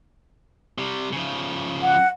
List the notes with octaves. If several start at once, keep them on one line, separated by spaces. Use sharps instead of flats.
C3 G3
C#3 F3
F#5